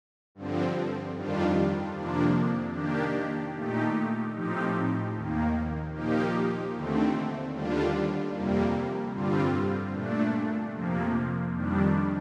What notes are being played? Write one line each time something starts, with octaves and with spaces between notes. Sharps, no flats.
G2 D3 F3 C4
F2 D#3 G3 D4 F4
F2 C3 F3 A#3 D4
D#3 A#3 D4 G4
A#2 A3 D#4 G4
A2 F3 C4 D#4 G4
D#2 D#3 A#3
A#2 F3 A#3 D#4 G4
D#2 D3 A3 C4
D#2 D3 G3 D4 F4
F2 C3 G3 A#3
G2 D3 G3 C4 F4
A#2 A3 D4
F2 C3 F3 A#3
F2 D#3 G3 D4